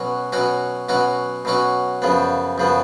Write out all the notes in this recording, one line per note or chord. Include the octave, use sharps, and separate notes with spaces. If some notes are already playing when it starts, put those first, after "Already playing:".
Already playing: B2 F#3 C#4 F#4
B2 F#3 C#4 F#4
B2 F#3 C#4 F#4
B2 F#3 C#4 F#4
F#2 C#3 F3 B3
F#2 C#3 F3 B3